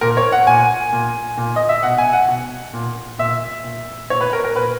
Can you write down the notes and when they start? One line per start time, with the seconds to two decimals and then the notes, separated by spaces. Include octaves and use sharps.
0.01 A#2 A#4
0.17 C#5
0.32 F#5
0.47 A#2 G#5
0.93 A#2
1.38 A#2
1.56 D#5
1.69 E5
1.83 B2 F#5
1.98 G#5
2.13 F#5
2.28 B2
2.73 A#2
3.19 A#2 E5
3.64 A#2
4.10 A#2 C#5
4.21 B4
4.33 A#4
4.44 A#4
4.55 A#2 B4